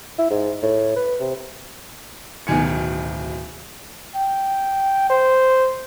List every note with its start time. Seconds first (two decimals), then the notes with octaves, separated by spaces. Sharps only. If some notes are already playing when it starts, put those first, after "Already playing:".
0.19 E4
0.30 G#2
0.63 A2
0.96 B4
1.20 C3
2.47 D1 B2 D#3 G#5 C#7
4.15 G5
5.10 C5